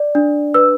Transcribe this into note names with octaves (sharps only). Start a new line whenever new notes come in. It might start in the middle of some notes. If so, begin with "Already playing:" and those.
Already playing: D5
D4
B4 E6